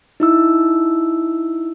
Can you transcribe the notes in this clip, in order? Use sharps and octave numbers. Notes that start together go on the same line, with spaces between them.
D#4 E4 E6